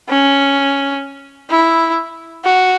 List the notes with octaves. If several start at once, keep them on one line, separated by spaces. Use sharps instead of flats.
C#4
E4
F#4